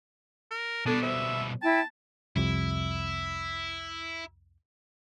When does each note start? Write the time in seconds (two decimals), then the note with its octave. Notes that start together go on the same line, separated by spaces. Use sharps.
0.51 A#4
0.86 B2 G3 B3 D4 A4
1.03 C5 E5
1.62 E4 G5 A5
2.36 C2 F2 C3 E4